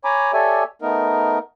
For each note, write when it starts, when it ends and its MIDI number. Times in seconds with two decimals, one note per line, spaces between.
0.05 0.32 73
0.05 0.32 80
0.05 0.32 82
0.05 0.32 83
0.05 0.32 86
0.33 0.64 67
0.33 0.64 69
0.33 0.64 73
0.33 0.64 74
0.33 0.64 76
0.33 0.64 80
0.82 1.39 57
0.82 1.39 59
0.82 1.39 63
0.82 1.39 70